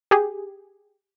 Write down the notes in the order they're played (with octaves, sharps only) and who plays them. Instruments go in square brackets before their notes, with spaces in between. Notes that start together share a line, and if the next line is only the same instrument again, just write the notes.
[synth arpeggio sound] G4 G#4